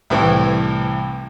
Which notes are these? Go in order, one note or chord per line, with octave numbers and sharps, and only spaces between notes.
C2 A2 E3